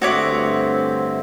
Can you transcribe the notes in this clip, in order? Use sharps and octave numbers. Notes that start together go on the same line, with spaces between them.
G2 D3 A3 C4 F#4 C#5 E5 D6